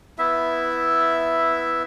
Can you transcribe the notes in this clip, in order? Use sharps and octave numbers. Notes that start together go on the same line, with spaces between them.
B3 E4 E5